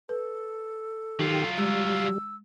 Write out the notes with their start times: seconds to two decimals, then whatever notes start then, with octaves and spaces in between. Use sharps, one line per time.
0.09 A4 B4
1.19 D#3 F#3 F4 G4
1.58 G3 G#3 E6